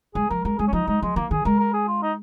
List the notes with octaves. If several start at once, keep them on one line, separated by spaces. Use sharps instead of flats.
G#3 G#4
F3 A#4
G#3 A#4
G#3 G#4
C#4
F3 D#4
G#3 D#4
F3 G#3
D#3 A#3
D#3 G#4
G#3 A#4
A#4
G#4
F4
D#4